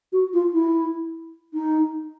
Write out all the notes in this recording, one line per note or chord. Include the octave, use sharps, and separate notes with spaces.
F#4
F4
E4
D#4